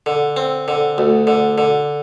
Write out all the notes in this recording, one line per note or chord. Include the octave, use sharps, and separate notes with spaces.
D3
C4
D3
D2
D3
D3